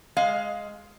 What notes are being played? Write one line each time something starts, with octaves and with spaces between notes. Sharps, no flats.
G#3 F5